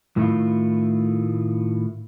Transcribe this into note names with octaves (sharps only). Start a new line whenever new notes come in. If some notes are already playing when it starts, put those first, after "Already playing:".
A2 D#3 A3 E4 F4